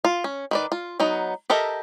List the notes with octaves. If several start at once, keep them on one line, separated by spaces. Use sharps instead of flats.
F4
C#4
D#3 B4 D5
F4
F#3 B3 D#4
G4 A4 A#4 D#5 E5